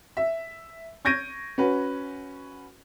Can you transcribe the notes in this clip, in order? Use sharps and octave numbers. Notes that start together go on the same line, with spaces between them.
E5
C#6 G6 G#6 A#6 D7 D#7
C#4 F#4 B4